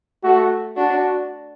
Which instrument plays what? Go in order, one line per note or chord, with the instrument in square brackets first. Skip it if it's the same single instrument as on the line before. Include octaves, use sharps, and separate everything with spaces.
[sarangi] A3 [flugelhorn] F#4
[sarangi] D4 [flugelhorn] F#4